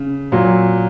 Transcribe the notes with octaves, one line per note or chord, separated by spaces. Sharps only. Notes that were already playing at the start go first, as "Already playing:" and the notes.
Already playing: C#3
A#2 F#3